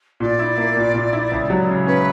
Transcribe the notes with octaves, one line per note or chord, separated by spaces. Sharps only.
A#2 D5
E4
A#3
A#2
A#2
E4
C#2
F#3
C#3
C#4 B4